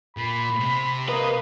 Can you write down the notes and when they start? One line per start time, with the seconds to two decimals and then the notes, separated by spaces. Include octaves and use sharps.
0.17 A#2 B5
0.60 C3
1.09 A#3 B4 D#5